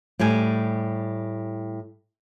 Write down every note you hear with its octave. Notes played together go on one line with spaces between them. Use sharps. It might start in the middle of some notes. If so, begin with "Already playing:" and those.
A2 G3 G4 G#5